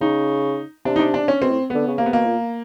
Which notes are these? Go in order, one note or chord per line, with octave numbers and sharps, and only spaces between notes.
C#3 D#4
C3 D4
D#4
D4
D4
C#4
B2 C4
A2
D3 B3
C#3
C3 A#3
B3
B2 A#3
A#2